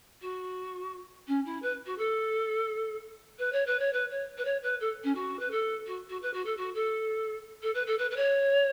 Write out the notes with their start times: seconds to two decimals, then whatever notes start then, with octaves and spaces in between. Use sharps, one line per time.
0.21 F#4
1.27 C#4
1.45 E4
1.62 B4
1.86 F#4
1.98 A4
3.38 B4
3.52 C#5
3.66 B4
3.79 C#5
3.93 B4
4.10 C#5
4.38 B4
4.45 C#5
4.63 B4
4.80 A4
5.04 C#4
5.15 F#4
5.39 B4
5.50 A4
5.87 F#4
6.09 F#4
6.22 B4
6.33 F#4
6.45 A4
6.57 F#4
6.74 A4
7.62 A4
7.74 B4
7.86 A4
7.98 B4
8.10 B4
8.16 C#5